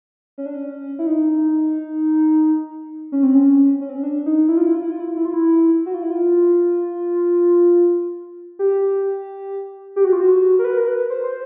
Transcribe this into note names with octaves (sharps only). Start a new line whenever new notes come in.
C#4
D4
C#4
E4
D#4
C#4
C4
C#4
C#4
C4
C#4
D4
D#4
E4
F4
E4
F4
E4
F4
E4
F4
E4
F4
E4
F#4
F4
E4
F4
G4
G4
F#4
F4
F#4
A#4
B4
A#4
B4
C5
C5